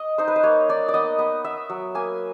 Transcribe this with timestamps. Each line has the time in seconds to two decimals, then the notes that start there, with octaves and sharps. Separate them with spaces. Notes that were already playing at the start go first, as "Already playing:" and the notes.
Already playing: D#5
0.18 D#4 C5
0.28 B4
0.36 C5
0.43 A#3 C#5
0.69 D#4 D5
0.89 D5
0.94 B3 D#5
1.19 B3
1.44 B3 E5
1.70 F#3
1.95 A#3 G#5